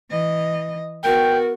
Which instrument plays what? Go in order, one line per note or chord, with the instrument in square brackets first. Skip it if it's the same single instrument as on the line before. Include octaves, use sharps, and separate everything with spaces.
[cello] E3 D#5
[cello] B3 F#4 [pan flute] A#4 [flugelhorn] G5